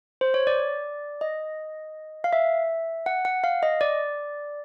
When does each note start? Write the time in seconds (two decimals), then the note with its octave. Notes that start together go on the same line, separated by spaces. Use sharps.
0.21 C5
0.34 C#5
0.47 D5
1.21 D#5
2.24 F5
2.33 E5
3.06 F#5
3.25 F#5
3.44 F5
3.63 D#5
3.81 D5